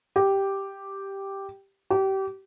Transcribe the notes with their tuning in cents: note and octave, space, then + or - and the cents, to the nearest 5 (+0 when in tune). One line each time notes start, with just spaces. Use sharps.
G4 +0
G4 -25